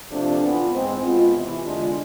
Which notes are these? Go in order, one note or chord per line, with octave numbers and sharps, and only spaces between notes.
C3 F3 A3 D4
E3 B3 F4
G#2 G#3 C4
B2 G#3 B3 F4
E2 C3 E3
D3 G#3 D4 F4